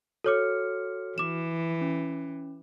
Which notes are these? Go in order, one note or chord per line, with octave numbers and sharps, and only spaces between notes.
F#4 A4 C#5 D6 F6 C#7
E3 D6 E7
C#4